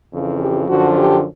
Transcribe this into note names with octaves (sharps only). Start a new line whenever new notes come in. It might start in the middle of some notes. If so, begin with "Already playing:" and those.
F2 C#3 E3
G4
F#2 D3 F3 F#4
G4